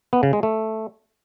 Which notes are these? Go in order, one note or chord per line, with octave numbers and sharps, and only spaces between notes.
B3
C#3
G#3
A3